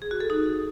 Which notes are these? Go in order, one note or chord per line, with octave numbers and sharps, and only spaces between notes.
G#4
F#4
A4
D#4